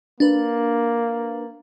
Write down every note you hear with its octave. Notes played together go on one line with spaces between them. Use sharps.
A#3 D4 B4